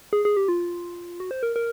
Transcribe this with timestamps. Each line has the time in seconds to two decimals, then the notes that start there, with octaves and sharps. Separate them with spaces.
0.13 G#4
0.25 G#4
0.37 G4
0.48 F4
1.20 F#4
1.31 C5
1.43 A#4
1.56 A#4